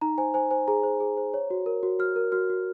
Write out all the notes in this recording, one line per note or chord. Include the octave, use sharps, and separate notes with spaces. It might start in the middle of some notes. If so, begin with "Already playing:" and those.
D#4 A#5
C5 G#5
C5 G#5
C5 G#5
G#4 A#5
C5
G#4
C5
C#5
F#4
A#4
F#4
F#4 F6
A#4
F#4 F6
F#4